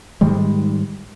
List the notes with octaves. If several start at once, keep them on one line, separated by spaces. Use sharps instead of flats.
G#2 D#3 G3 G#3